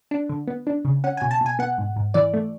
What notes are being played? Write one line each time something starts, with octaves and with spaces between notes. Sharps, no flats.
D4
D3
B3
D4
C#3
C#4 F#5
B2 G#5
A5
B2
G#5
B3 F#5
G#2
G#2
E3 D5
A3